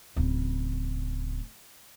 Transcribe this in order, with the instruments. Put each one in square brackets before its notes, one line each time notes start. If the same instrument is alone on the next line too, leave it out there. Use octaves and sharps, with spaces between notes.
[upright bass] D1 C#3